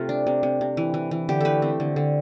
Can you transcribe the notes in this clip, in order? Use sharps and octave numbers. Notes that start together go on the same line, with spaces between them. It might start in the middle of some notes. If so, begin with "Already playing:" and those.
Already playing: C3 A3 F4
D4
C3
C3
C3
E3
E3
E3
D3 G4
A3 A4 B4
C4
D3
D3